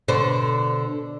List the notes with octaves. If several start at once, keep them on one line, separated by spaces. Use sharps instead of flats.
B2 D3 C5